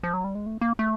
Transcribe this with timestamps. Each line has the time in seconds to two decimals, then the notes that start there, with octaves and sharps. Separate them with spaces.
0.03 F3
0.14 F#3
0.24 G3
0.35 G#3
0.46 A3
0.61 A#3
0.79 A3